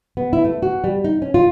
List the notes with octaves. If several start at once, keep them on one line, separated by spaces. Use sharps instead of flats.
B3
E4
A3
F#4
G3
D#4
C#4
F4